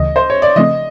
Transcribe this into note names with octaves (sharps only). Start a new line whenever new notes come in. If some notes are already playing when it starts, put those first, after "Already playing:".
Already playing: D2 C#3 E3 D#5
C5
C#5
D5
C#3 F3 A3 C4 D#5